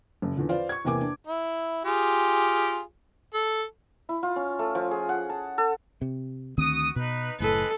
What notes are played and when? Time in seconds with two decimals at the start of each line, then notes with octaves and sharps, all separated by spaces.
0.22 F#1
0.36 E2 D3 F3
0.49 F4 B4 C5 D5 F5
0.69 C#6 G#6
0.85 E2 C3 A#3 G#5 D6
1.01 D4
1.27 E4
1.85 F4 G4 G#4
3.34 A4
4.09 E4
4.23 F4
4.36 C#4
4.59 A3
4.75 F3
4.91 G#4
5.09 F#5
5.29 A5
5.58 A4
6.01 C3
6.58 D2 D#3 C4 F#4 D#6
6.96 B2 D#4 B4
7.40 F#1 A2 G#3 A4 B4